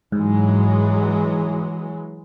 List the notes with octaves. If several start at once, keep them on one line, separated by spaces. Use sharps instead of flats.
G#2 E3 F#3 G#3